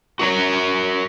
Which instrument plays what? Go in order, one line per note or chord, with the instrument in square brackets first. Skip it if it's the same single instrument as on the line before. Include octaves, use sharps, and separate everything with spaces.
[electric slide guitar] F#4 A#4 C#5